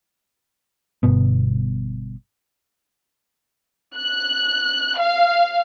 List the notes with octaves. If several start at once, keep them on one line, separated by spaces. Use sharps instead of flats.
G1 G2 B2 B3
F#6
F5